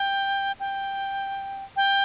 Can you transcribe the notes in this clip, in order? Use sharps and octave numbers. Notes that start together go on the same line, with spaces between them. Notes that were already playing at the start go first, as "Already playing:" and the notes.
Already playing: G5
G5
G5